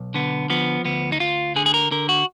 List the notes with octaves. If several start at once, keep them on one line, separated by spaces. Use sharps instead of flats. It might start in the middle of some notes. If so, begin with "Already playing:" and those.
Already playing: B1
D3 B3
F3 B3
D2 B3
D#4
D2 F4
D3 G#4
G#4
A#4
D3 A#4
F#4